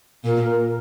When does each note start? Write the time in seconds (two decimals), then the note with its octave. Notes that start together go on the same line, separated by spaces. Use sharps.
0.25 A#2 A#4
0.50 A#4